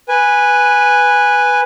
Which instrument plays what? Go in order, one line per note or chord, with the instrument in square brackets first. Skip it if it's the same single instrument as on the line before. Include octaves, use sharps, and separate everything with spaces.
[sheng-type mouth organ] B4 G#5